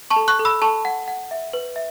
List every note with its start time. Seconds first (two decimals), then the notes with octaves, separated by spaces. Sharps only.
0.10 A5 C#6
0.16 A4
0.28 C#6 F#6
0.39 A4
0.45 B5 E6
0.62 A4 A5 C#6
0.85 F#5
1.08 F#5
1.31 E5
1.53 B4
1.76 E5